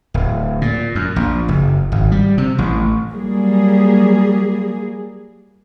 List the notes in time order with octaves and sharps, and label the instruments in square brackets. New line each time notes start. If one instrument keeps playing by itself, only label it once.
[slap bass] D1
A#2
F#2
A#1
F#1
G#1
G3
C3
A1
[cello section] F#3 G3 A#3 G#4